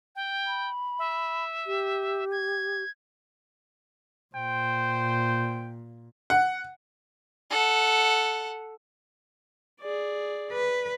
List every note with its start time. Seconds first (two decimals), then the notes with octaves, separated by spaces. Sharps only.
0.16 G5
0.47 B5
0.99 E5
1.67 G4
2.31 G#6
4.35 A#2 C5 G5
6.30 F#5
7.51 A4 F#5
9.80 G#4 D5
10.52 B4